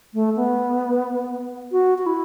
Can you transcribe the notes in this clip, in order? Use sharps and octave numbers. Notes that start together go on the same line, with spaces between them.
A3
B3
F#4
F#4
E4